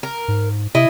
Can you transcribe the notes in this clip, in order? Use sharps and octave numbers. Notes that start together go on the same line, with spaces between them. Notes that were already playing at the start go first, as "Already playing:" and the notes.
A#4
G#2
C3 E4 D#5